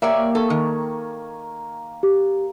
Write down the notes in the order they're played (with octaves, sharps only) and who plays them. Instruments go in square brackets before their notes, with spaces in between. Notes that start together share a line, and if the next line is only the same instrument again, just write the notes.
[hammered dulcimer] A#3 G4 [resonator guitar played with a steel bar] C#5 D5 E5
[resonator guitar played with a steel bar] A4 [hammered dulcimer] G#5 C#6
[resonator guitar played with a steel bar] D#3
[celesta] G4